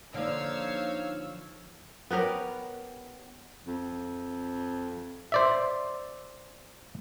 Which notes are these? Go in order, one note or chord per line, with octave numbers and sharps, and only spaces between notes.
D3 F3 A#3 D#4 C#5 F5 E6
B3 G4 A#4 C#5
F2
C5 D5 E5